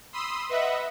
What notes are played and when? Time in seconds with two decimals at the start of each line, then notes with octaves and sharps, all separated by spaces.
0.13 B5 C6 D#6 E6
0.49 B4 D#5 E5 F#5